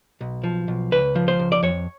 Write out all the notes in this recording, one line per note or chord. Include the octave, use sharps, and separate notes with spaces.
B1
F3
B1
C#2 B4
F3
C5
C#2
D5
F2 C#5